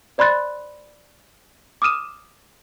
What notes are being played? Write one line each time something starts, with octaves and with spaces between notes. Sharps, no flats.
C5 D5 B5 C6 F#6 A6
D6 D#6 F6 D#7 E7